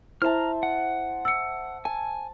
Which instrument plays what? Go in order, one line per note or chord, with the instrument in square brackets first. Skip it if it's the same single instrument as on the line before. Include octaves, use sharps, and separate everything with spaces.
[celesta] E4 [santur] C5 E5 A5 [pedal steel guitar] A#5 F6
[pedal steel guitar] F#5
[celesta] E6 C#7
[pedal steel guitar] G#5 [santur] A5